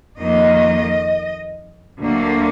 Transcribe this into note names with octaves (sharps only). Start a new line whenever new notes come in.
F2 D#3 A#3 D#5
D2 D3 F#3 A#3